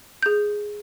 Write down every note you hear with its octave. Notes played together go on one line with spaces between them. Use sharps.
G#4 G6